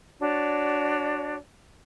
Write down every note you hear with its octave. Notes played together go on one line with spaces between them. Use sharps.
D4 F#4 C#5 D5